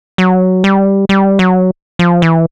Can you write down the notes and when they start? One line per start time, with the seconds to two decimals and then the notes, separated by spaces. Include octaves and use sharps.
0.18 F#3
0.64 G3
1.09 G3
1.39 F#3
1.99 F3
2.22 E3